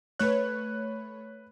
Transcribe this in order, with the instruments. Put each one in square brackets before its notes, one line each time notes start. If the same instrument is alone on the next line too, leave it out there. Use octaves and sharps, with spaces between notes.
[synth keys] A3 C#5 [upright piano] B4 F#6